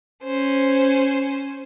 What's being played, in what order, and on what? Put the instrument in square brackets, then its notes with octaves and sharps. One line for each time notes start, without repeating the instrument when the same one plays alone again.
[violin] C#4 C5